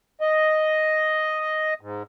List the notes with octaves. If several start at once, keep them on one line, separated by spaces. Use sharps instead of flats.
D#5
G#2